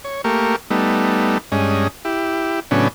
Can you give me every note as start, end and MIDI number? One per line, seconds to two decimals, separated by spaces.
0.04 0.22 73
0.24 0.56 57
0.24 0.56 58
0.24 0.56 67
0.24 0.56 70
0.24 0.56 85
0.70 1.38 55
0.70 1.38 57
0.70 1.38 59
0.70 1.38 63
1.52 1.88 43
1.52 1.88 56
1.52 1.88 61
1.52 1.88 75
2.05 2.60 64
2.05 2.60 67
2.71 2.88 45
2.71 2.88 49
2.71 2.88 54
2.71 2.88 59
2.71 2.88 61
2.71 2.88 62